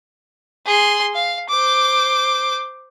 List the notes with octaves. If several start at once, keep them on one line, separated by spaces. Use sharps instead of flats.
G#4 C6
F5
C5 D6